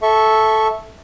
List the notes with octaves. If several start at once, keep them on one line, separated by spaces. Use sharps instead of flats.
A4 E5 C#6